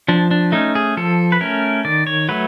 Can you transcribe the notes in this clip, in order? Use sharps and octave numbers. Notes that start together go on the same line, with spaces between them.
F3 D4
D4
A3 C#4 D#4
G#4
F3 A4
B4
A3 C#4 A#4
D#3 D5
C#5
F#3 A3 B4